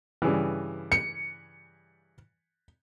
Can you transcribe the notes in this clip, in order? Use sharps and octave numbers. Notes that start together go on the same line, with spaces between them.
G2 C#3 E3
C#7